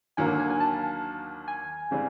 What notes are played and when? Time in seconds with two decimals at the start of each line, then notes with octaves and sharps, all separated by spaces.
0.17 D#2 D3 F#3 A#3 G#5
0.39 G#5
0.50 G#5
0.60 A5
1.48 G#5
1.91 C#3 E3 G3 C4